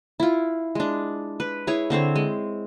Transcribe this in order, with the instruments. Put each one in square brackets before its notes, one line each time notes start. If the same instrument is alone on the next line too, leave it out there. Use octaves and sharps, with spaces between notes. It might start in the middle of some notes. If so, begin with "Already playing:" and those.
[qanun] E4 F4
G#3 D4
B4
E4 G#4 C#5
D3 C4 C5 C#5
G#3